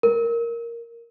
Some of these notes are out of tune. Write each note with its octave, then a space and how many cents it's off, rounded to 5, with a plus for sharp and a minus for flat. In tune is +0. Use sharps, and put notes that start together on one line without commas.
A#4 +0